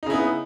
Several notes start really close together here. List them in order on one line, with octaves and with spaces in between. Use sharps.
D#4 C#3 E4 B3